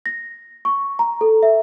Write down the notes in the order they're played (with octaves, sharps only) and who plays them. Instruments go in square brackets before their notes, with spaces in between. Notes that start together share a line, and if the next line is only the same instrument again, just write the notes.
[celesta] A#6
C#6
A#5
A4
E5